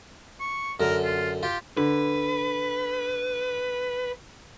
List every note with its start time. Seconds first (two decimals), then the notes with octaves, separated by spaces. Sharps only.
0.40 C#6
0.80 F#2 D3 A#4
1.04 F4
1.43 F4 G4
1.77 D3 B4